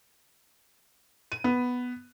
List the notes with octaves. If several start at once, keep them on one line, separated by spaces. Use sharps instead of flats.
D#7
B3